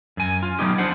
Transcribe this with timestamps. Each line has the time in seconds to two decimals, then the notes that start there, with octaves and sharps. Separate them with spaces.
0.17 F#2 G#5
0.43 F4
0.59 F#3 A3 B3 C#4 D#4 G4
0.78 F3 D4 C5 F#5